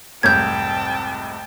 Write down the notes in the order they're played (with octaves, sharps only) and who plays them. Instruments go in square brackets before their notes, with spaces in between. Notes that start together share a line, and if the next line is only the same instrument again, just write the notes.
[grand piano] F1 C2 G#2 [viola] G5 A5 [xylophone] G6 G#6